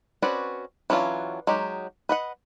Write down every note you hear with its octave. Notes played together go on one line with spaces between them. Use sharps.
C4 C#4 F#4 B4 D5
E3 F#3 C#4 D4 F4
F#3 G#3 D#4 G4
B4 D#5 F#5